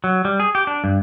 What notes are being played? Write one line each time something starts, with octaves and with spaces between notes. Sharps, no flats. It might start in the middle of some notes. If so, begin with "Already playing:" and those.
F#3
G3
G#4
G4
D4
G2